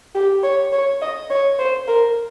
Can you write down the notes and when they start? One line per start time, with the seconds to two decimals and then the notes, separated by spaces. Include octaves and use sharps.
0.15 G4
0.43 C#5
0.72 C#5
1.01 D#5
1.30 C#5
1.59 C5
1.88 A#4